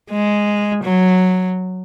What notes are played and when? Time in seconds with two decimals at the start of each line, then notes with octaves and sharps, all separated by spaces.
0.11 G#3
0.84 F#3